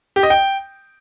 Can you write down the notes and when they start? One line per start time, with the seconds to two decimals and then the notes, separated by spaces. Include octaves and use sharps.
0.16 G4
0.23 D#5
0.30 G5